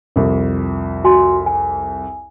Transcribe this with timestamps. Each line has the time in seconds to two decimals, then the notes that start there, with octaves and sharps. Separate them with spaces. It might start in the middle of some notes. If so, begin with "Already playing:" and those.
0.16 C2 F2
1.04 F#4 G#5 C6
1.46 G#5